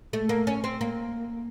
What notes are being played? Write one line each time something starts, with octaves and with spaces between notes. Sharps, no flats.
A3
A#3
C#4
C4
A#3